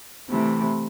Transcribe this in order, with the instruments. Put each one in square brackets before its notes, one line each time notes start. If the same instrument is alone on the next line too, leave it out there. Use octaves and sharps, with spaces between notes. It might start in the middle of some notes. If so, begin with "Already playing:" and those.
[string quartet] C3 E3 A3